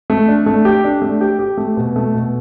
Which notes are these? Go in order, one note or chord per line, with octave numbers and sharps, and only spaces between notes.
A3
D4
A3
G4
D4
A3
G4
G4
A3
B2
A3
B2